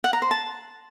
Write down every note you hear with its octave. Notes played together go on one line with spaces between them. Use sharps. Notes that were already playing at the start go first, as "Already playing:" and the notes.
F#5
A#5
C5
A5